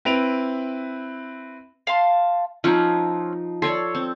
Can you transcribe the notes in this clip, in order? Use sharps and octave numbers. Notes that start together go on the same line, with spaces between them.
C4 E4 B4 D7 F7
F5 A5 C6
F3 C4 C#4 D#4 F#6
A4 C#5 D5 C6
C4